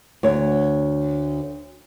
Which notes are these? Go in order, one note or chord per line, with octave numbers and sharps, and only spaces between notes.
D2 C#5